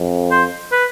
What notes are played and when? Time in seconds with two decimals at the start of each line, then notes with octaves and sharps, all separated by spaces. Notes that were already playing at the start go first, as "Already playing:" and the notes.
Already playing: F2
0.31 C5
0.72 B4